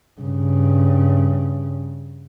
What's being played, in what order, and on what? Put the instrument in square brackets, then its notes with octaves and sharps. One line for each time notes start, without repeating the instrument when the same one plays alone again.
[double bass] G2 C#3